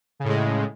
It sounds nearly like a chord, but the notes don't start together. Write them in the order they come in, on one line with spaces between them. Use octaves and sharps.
C#3 A2 G#3